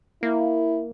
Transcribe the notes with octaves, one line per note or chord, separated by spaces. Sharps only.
A#3 E4